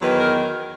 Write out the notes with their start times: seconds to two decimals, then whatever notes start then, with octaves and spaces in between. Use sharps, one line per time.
0.01 E2 D#3 F#3 B4
0.17 A#4